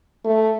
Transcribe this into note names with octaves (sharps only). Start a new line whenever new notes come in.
A3